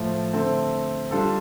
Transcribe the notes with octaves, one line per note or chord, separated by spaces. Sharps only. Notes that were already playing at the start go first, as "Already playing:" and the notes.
Already playing: A2 F3 A3
D3 A3 C4 A4
G3 D4 F4 A4